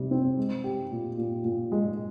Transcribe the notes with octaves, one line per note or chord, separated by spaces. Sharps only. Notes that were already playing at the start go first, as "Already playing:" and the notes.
Already playing: C3 G3
C4
G#3
G4
A#2
A#2
A#2
G#3